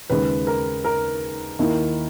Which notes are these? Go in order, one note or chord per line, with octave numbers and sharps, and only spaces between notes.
D#2 C#3 G#3 B4
A#4
A#4
D#2 D#3 A#3 E4